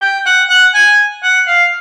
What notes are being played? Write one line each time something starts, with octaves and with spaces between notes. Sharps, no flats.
G5
F#5
F#5
G#5
F#5
F5